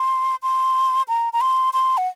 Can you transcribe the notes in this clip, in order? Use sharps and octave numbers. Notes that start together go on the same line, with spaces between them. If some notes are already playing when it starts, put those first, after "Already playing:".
Already playing: C6
C6
A#5
A#5
C6
C6
F#5